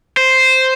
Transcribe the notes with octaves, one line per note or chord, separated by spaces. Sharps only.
C5